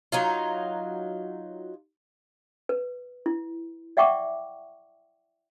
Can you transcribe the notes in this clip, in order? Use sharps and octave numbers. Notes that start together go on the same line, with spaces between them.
F#3 D#4 F4
B4
E4
D5 E5 F#5 G5 C#6 D6